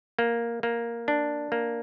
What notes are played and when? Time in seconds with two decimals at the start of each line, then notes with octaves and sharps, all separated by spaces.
0.19 A#3
0.63 A#3
1.08 D4
1.52 A#3